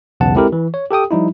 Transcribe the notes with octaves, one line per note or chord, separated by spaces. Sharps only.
B1 E2 C#3 F#5 A5
G#3 C4 E4 G4 A4 A#4
E3
C#5
G4 A4 G5 D#6
F3 G3 D#4 E4